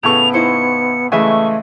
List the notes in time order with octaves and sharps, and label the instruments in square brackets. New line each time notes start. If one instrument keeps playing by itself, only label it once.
[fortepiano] A2 C#3 C#6 [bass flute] B3 [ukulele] G#4 A4 [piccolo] F7
[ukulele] D#4 E4 C5 [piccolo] C#7
[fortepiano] C#3 E3 G#3 [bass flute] A3 [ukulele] D#5 E5 G#5 [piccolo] C#6